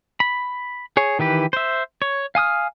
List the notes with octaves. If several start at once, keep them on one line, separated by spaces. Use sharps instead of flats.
B5
G#4 C#5
D#3 E3 G4 B4
C5 E5
C#5
F5 G#5 D#6 F6